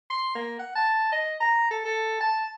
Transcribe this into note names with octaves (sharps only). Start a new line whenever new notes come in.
C6
A#3
F#5
A5
D#5
A#5
A4
A4
A5